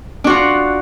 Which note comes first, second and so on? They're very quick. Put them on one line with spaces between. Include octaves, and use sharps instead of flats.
D4 F#4 F4